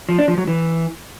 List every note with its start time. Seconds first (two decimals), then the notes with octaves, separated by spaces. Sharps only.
0.09 F3
0.18 D4
0.28 F3
0.38 F#3
0.47 E3